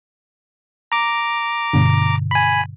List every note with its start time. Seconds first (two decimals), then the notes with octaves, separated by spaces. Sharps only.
0.92 A#5 D6
1.73 G2 B2 D3
2.31 G#5 B5